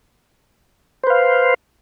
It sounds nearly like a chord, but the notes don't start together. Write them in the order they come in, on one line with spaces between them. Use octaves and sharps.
C5 B4 F5